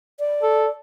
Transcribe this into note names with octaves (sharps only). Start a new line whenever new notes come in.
D5
A4